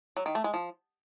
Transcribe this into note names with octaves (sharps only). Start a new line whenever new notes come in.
F#3
D#3
A3
G#3
F3